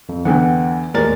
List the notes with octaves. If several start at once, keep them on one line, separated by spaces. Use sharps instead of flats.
F2
E2 D3 E3 F#5 G5
D#2 A2 G#3 A#4 D5 A6